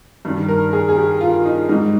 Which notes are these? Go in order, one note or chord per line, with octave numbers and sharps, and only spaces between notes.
G2 D#3 G3
A#4
G#4
G#4
G4
F4
D#4
G#2 G3 D#4